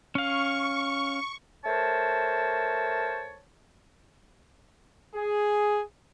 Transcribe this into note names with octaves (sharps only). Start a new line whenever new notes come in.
C#4 F5 C#6
A3 A#4 C5 C#5 A5
G#4